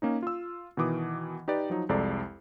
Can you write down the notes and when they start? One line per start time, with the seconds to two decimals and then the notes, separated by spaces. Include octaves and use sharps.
0.02 A#3 C#4 D#4
0.23 F4 E6
0.77 B2 D#3 E3 D6 D#6
1.48 D#4 G4 B4 D5
1.70 F3 F#3 D#4
1.89 C2 F2 G#3 A4 D5 A#5